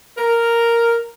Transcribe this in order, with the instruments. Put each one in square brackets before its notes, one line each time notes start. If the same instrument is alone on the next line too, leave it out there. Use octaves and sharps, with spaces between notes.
[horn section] A#4